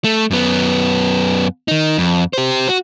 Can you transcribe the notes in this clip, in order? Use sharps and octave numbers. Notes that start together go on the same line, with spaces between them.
A3
F#2 B3
D#3 D#4
F2
G4 C5
F#4